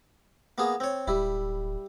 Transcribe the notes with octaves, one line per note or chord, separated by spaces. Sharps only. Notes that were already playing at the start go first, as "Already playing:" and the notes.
A#3 B3 G#4
C4 C#5
D1 G3 E4